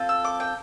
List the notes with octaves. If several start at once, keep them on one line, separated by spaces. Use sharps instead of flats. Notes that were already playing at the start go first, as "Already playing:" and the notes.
Already playing: C4 F4 A4
E6
D6
G5